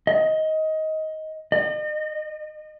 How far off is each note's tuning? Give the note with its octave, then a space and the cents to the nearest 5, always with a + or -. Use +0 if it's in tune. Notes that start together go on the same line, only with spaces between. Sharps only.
D#5 +15
D#5 -40